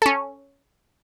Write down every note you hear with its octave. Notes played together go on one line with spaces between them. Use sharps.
C#4 A4